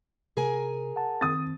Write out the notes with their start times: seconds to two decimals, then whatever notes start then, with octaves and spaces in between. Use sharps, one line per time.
0.37 C3 G#4 A#4 G#5
0.96 F#5 A5
1.21 D#3 C4 D#6 A6